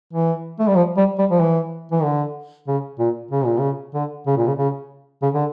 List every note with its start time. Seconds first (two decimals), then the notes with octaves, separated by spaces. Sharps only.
0.13 E3
0.59 A3
0.67 G3
0.75 F3
0.97 G3
1.18 G3
1.30 F3
1.40 E3
1.92 E3
2.03 D3
2.67 C#3
2.99 A#2
3.31 C#3
3.45 A#2
3.59 C#3
3.94 D3
4.27 C#3
4.37 A#2
4.47 C#3
4.58 C#3
5.22 C#3
5.34 D3